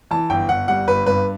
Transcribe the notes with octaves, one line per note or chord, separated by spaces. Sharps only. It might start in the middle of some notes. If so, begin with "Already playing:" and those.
E3 A5
G1 G5
G1 F#5
G3 F#5
G1 B4
G2 B4